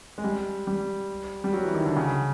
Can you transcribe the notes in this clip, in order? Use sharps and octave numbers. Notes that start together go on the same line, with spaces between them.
G#3
G3
G3
G3
F#3
E3
D#3
D3
C#3